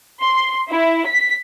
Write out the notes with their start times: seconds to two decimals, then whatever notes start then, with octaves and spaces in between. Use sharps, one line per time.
0.21 C6
0.69 E4
1.05 B6